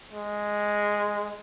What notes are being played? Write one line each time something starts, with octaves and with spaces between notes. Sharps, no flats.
G#3